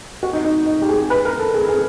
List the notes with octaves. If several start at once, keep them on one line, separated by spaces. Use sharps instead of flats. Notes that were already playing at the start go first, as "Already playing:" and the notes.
F#4
D#4
D#4
D#4
G4
G#4
B4
A#4
A4
G#4
G#4